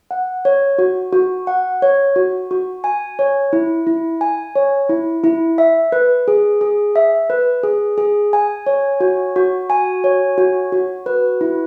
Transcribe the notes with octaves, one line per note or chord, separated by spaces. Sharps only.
F#5
C#5
F#4
F#4
F#5
C#5
F#4
F#4
G#5
C#5
E4
E4
G#5
C#5
E4
E4
E5
B4
G#4
G#4
E5
B4
G#4
G#4
G#5
C#5
F#4
F#4
G#5
C#5
F#4
F#4
B4
E4